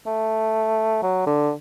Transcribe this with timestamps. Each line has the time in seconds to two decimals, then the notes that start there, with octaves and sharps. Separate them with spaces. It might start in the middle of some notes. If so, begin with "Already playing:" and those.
0.06 A3
1.02 F#3
1.27 D3